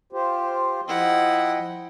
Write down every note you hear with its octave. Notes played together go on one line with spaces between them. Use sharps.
F4 G4 C5
F3 E4 D#5 F#5 G5